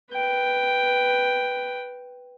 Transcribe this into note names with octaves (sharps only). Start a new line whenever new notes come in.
B4 G5